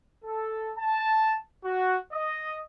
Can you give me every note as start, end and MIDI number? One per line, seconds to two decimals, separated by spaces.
0.24 0.71 69
0.78 1.36 81
1.64 1.97 66
2.12 2.59 75